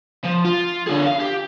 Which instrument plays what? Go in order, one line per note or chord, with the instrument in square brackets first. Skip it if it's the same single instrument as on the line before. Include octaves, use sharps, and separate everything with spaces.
[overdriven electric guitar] F3
F4
D3 G#4
F5
G4